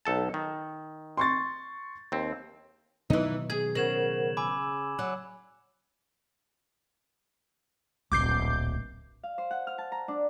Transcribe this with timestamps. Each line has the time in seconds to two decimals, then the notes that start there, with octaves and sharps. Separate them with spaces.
0.05 B1 A4 A5
0.34 D#3
1.17 C6 C#6 A6
2.12 D#2 C4
3.10 B2 D#3 E3 F#3 D#4
3.50 G#4 G#6
3.75 C#3 A#4 C5 F#5 G#6 E7 F#7
4.37 G#5 B5 D6 E6
4.99 F#3
8.12 D1 A#1 D6 G6 C7
9.23 F5
9.38 C5
9.51 F#5
9.67 F6
9.78 A5
9.92 A#5
10.08 D4